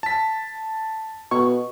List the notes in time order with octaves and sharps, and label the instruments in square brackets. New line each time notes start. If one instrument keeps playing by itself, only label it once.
[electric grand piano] A5 B6
[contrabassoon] B2 [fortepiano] C#6